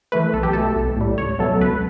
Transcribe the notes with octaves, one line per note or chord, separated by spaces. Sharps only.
E3 A3 B4
B1 A4
G4
B2 A3 A4
B1
A2 G3
C#2 C#5
B2 F#3 A3 A4
C#2 B4